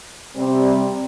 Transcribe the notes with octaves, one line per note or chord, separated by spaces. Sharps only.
C3 G3 C4